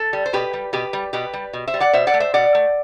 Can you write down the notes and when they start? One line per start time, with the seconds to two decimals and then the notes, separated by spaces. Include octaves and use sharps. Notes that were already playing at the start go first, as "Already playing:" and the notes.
Already playing: A4
0.13 G3
0.26 C5
0.33 B2 G4 B4
0.53 G3
0.73 B2 G4 B4
0.93 G3
1.13 B2 G4 B4
1.33 G3
1.53 B2
1.67 C5 E5
1.74 G3
1.80 D5 F#5
1.93 B2 C5 E5
2.07 D5 F#5
2.14 A3
2.20 C5 E5
2.34 B2 D5 F#5
2.55 A3